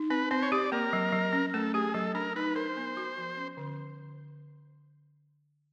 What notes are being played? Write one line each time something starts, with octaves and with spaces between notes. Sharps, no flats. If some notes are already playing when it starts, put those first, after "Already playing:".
Already playing: D#4
C4 B4
C4 C5
C#5
G4 D5
A#3 A#4
F#3
F#3
C#4
A3 A4
G4 G#4
F#3 A4
D4 A#4
D#4 B4
A#4 C5
B3
F#4
F3
C#4
D3